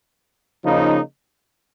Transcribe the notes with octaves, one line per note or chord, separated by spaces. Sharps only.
C#3 F3 A#3 D#4